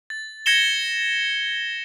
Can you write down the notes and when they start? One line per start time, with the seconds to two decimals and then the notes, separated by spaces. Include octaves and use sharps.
0.10 A6
0.46 G#6 A#6 C#7 E7 G7